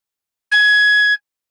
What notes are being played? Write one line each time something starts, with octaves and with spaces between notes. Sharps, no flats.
G#6